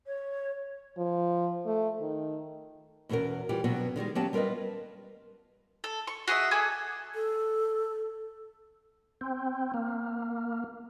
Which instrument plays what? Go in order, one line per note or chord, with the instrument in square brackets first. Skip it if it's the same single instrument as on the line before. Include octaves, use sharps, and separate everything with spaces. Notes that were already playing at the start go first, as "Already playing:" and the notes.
[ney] C#5
[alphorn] F3
A3
D#3
[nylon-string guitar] E2 B2 B3 C#4 A#4
E3 G3 F4 G4
G2 B2 F#3 B3 C4
D3 D#3 G3 G#3
F#3 B3 C#4 G4 F5 A5
G3 F4 A#4 B4 D#5
[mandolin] A4
C#6
F#4 G#4 D#5 E5
G#4 A4 G#5 D6
[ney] A4
[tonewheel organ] C4
A#3